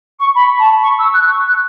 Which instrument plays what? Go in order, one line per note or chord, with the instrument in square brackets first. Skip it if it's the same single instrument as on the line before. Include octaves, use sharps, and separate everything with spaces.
[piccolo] C#6
B5
A5
C#6
E6
F#6
C#6
F#6